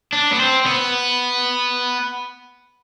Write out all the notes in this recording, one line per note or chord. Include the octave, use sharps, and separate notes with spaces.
D4
B3
C4
B3